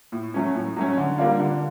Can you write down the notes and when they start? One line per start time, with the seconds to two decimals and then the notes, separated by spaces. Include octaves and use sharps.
0.12 A2
0.34 F#3 A3 C#4
0.55 A2
0.76 F#3 A3 C#4
0.98 D3
1.18 G3 A#3 D4 F4
1.40 D3